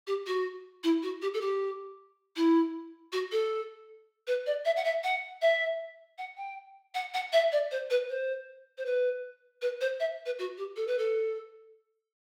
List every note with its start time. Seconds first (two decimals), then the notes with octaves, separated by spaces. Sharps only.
0.07 G4
0.27 F#4
0.84 E4
1.03 F#4
1.22 G4
1.34 A4
1.41 G4
2.36 E4
3.13 F#4
3.32 A4
4.27 B4
4.46 D5
4.65 E5
4.77 F#5
4.85 E5
5.04 F#5
5.42 E5
6.18 F#5
6.37 G5
6.95 F#5
7.14 F#5
7.33 E5
7.52 D5
7.71 C5
7.90 B4
8.10 C5
8.78 C5
8.86 B4
9.62 B4
9.81 C5
10.00 E5
10.26 B4
10.39 F#4
10.58 G4
10.77 A4
10.87 B4
10.98 A4